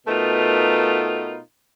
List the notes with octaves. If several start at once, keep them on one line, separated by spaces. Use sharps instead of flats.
B2 A3 B3 D#4 F4 A#4